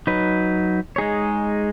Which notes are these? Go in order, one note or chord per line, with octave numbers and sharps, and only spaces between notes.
F#3 D#4 B4
G#3 D#4 G#4 C#5